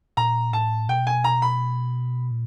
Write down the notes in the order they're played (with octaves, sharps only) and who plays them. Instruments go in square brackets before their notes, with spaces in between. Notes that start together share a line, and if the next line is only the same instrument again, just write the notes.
[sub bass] A#2 [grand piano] A#5
[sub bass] A2 [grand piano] A5
[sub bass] B2 [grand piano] G5
[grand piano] G#5
A#5
B5
[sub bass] A#2